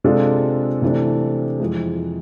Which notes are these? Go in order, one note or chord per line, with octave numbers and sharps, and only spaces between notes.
C3 G#3 D4 F4 A4
C3 E3 A3 D4
F2 E3 G#3